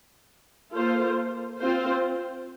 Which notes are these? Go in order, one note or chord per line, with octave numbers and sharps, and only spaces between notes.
A#3 F4 A4 C5
C4 F4 C5